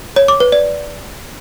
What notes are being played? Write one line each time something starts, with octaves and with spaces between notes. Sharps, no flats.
C#5
D6
B4
D5